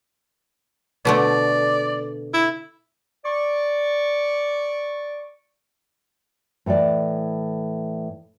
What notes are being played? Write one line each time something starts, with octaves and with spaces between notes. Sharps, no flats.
B2 D3 A3 D5
E4
D5 C#6
A2 E3 A4 D5 A5